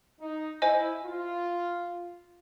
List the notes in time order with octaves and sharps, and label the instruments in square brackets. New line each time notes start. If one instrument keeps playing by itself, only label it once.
[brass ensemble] D#4
[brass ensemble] E4 [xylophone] C5 D#5 G#5
[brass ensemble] F4